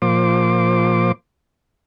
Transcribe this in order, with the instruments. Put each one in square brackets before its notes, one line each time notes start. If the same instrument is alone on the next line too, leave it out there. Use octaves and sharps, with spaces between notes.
[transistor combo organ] A#2 F3 C5 D6